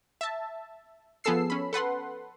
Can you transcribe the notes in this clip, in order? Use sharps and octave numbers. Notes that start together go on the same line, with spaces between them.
E5 A5
F3 B3 G#4 A4 E6 C7
C#4 B5
A4 B4 F#5 C6